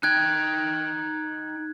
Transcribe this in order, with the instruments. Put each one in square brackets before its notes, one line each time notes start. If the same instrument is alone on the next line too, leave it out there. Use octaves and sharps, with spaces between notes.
[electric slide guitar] D#4 G5 [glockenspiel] F#6 G#6